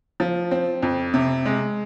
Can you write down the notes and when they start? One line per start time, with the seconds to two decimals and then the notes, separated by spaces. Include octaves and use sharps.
0.20 F3
0.51 C4
0.83 F2
1.14 C3
1.46 G#3